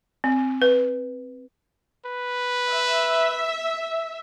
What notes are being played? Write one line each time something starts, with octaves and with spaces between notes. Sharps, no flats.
C4
B4
B4
E5